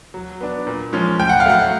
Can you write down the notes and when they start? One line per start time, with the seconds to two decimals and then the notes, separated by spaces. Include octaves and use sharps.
0.14 F#3
0.41 B3 D4
0.67 A#2
0.93 F3 G#3 C#4
1.19 A2 G5
1.29 F#5
1.40 F5
1.46 F#3 A3 F#5